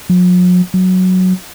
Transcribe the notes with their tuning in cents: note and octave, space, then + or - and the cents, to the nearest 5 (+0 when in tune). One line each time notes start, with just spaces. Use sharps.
F#3 -45
F#3 +0